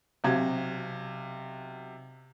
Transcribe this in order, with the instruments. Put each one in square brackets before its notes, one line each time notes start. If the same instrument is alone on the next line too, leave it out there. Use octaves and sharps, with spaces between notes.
[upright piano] B1 C3 F#4 G#6